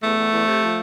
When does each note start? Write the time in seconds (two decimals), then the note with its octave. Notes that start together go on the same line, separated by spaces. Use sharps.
0.02 E2 A3
0.17 E2
0.31 E2
0.47 C3
0.62 F3